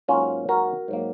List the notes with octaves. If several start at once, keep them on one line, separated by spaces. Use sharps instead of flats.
G#2 F#3 A#3 C#4 F4
F#4 A#4
G#2 F#3 A#3